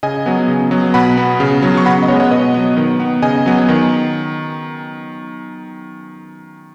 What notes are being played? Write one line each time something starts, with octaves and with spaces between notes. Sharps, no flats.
C#3 D#5 G#5
F#3 B3
C#3
F#3 B3
B2 F#5 B5
B3
C#3
F#3 B3
C#6
C#3 F#5 B5
D#5
G#3 B3 C#5 F#5
C#5 F#5
B2 B4 D#5
F#3 B3
D#3
B3
C#3 D#5 G#5
F#3 B3
D#3